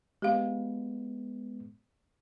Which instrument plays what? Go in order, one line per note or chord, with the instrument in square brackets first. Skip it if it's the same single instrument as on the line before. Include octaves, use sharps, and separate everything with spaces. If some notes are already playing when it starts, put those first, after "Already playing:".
[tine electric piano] G#3 B3 [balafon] G4 F5